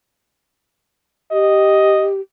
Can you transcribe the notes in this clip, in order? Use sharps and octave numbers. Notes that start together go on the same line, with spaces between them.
G4 D#5